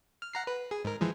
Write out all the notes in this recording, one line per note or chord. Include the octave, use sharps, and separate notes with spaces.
F6
F#5 A#5 C7
B4
G#4
G#2 A#4
E3 F3 G#3